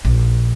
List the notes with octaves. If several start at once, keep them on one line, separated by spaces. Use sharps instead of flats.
A#1